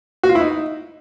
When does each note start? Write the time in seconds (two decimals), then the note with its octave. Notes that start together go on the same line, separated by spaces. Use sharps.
0.23 F#4
0.29 F4
0.35 E4
0.41 D#4